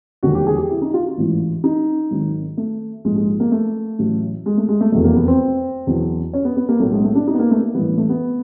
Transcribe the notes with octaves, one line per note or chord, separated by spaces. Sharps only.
E1 D#2 D3 F3 F#4
G4
G#4
G4
E4
D#4
F4
F#4
A1 G#2 E3
D#4
G#1 G#2 D#3 F#3
A3
A#1 G#2 F3 G#3
G#3
A#3
A3
A1 A2 F#3
G#3
A3
G#3
A3
F1 E2 B2 F#3 A3
A#3
B3
C4
E2 B2 F#3
C#4
B3
B3
A#3
B1 A2 F#3 A3
G#3
A3
D4
D#4
B3
A#3
A3
A#3
A1 G2 E3 B3
A3
B3